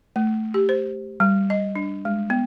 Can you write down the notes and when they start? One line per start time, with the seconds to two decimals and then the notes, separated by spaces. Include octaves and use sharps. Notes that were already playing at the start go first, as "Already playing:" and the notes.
0.16 A3
0.54 G4
0.69 C5
1.20 G3
1.50 D#5
1.75 D4
2.05 G#3
2.30 B3